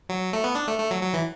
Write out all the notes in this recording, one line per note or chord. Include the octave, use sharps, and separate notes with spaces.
F#3
A3
B3
D4
A3
A3
F#3
F#3
E3